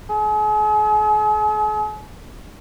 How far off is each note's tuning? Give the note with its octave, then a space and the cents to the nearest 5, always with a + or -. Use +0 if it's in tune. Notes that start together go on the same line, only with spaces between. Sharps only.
G#4 +40